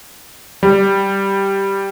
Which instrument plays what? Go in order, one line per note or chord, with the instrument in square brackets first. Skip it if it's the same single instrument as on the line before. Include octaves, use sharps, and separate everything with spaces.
[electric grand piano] G3